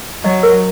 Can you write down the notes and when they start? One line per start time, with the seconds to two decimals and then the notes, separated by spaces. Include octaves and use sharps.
0.24 F#3 D#5
0.43 A#4